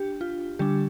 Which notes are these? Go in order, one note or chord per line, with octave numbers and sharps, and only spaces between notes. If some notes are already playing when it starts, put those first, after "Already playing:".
Already playing: D4 G4
F4
D3 G3 D4 G4